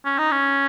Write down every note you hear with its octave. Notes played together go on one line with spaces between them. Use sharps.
C#4
D#4
C#4